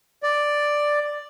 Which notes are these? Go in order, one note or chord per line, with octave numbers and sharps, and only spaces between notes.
D5